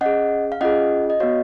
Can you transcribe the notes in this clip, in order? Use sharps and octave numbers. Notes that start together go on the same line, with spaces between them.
C#4 G#4 D#5 F#5
F5
C#4 F4 G#4 D#5 F#5
D#5
B3 F#4 C#5 F5